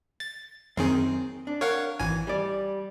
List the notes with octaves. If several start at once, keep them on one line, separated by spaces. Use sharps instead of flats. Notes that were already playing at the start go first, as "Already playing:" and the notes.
A6
F#2 D#3 C4 G#4
D4
A#4 C#5 F5 F#5
G#1 E3 G#5
G3 D5